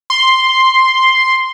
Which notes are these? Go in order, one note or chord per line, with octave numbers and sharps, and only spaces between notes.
C6